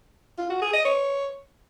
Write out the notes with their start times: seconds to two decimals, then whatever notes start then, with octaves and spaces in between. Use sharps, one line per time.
0.38 F4
0.50 F#4
0.62 G#4
0.73 D#5
0.85 C#5